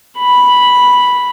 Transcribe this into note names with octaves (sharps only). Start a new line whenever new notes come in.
B5